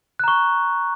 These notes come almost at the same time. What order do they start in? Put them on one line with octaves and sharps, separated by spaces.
F#6 A#5 C#6